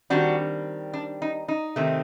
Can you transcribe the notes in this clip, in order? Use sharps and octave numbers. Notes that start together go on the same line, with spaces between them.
D#3 G3 C4 D4 F#4
D4
D#4
D#4
C3 D#3 A3 C4